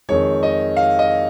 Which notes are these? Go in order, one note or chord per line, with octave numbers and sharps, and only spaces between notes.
F2 D#3 G#3 C#5
D#5
F5
D#5